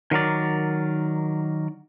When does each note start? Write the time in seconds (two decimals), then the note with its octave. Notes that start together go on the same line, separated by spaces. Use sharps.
0.11 D#3 F#3 A#4 D5